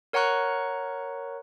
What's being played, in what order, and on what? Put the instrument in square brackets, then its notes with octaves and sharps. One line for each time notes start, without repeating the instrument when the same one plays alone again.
[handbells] A#4 C#5 F#5 A#5 C#6 F#6